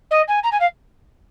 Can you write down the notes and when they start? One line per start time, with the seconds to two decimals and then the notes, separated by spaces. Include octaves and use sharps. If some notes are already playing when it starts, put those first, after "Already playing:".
0.10 D#5
0.27 G#5
0.43 A#5
0.51 G#5
0.60 F5